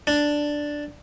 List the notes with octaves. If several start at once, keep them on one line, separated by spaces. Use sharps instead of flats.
D4